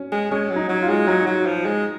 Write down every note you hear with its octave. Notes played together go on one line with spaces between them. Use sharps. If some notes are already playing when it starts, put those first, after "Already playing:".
Already playing: C#4
G#3
G#3 C#4
F#3
D#4
F#3
F4
G#3
F#3 D#4
F#3
F3
G#3